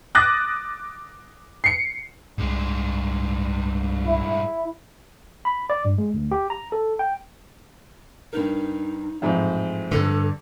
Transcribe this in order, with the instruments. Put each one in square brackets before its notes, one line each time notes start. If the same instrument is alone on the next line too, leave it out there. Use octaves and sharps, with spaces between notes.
[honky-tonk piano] D6 D#6 F#6 A6 A#6
C7 C#7
[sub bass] C2 [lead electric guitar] G2 G#3
[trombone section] E4
[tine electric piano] B5
D5
G2
G#3
D2
G4
A#5
A4
G5
[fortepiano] G2 A#4 [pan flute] D#4
[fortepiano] A1 F2 G#2
[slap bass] G2 D3 [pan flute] A4